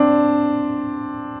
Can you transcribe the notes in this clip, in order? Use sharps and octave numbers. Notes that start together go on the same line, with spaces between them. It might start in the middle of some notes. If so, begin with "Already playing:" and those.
Already playing: C4 D4